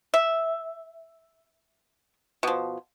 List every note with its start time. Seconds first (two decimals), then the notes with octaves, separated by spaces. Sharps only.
0.14 E5
2.43 B2 F3